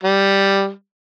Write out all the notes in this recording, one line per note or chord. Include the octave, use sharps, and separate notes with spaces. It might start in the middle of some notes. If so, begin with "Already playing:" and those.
G3